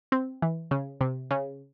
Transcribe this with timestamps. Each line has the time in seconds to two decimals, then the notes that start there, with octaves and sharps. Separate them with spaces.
0.12 C4
0.42 E3
0.71 C#3
1.01 C3
1.31 C#3